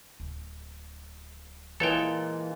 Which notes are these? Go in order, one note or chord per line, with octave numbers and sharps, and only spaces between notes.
D1
A#2 E3 G#3 A4 C#5 G5